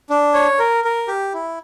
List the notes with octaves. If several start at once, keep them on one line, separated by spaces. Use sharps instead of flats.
D4
C#5
A#4
A#4
G4
E4